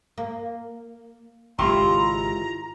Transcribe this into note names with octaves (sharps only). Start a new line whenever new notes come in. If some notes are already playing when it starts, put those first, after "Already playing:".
A#3
G#1 C#3 G#3 E4 F4 G4 A#5 C6